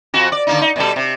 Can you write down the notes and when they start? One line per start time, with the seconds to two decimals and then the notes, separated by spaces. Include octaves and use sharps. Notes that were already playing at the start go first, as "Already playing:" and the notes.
0.14 F2 F3 F#4
0.32 D5
0.47 D3 A#3 D#4
0.62 D#4
0.76 B2 G3 A4
0.96 C3